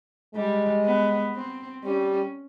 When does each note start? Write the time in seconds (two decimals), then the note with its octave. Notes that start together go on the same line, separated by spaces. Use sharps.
0.35 G3 G#3
0.85 B3
1.35 C4
1.84 G3 C#4